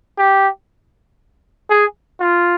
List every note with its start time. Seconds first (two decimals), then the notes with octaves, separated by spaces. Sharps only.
0.18 G4
1.70 G#4
2.20 F4